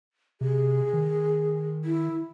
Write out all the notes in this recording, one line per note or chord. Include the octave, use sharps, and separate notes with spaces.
C3 G#4
D#3
E4